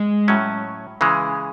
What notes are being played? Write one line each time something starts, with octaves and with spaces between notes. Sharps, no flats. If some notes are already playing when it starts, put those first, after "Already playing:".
Already playing: G#3
A2 F#3 C#4
C#3 E3 G#3